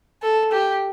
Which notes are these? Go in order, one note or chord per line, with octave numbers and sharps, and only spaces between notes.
A4
G4